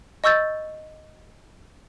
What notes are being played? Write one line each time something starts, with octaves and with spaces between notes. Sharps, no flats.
D#5 C#6 E6 G6 A6